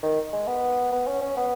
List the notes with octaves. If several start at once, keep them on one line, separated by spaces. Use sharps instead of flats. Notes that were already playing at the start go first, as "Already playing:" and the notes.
D#3
G#3
B3
B3
C#4
C#4
B3